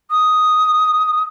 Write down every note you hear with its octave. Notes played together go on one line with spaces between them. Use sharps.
D#6